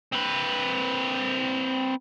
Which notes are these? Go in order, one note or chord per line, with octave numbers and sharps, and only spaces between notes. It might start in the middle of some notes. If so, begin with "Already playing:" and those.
C4 B4